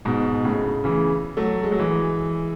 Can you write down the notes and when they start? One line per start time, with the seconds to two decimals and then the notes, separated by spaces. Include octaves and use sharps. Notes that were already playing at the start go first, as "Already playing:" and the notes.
0.05 G#2 B2
0.44 A2 C#3
0.84 C#3 E3
1.37 F#3 A3
1.63 G#3
1.72 F#3
1.79 E3 G#3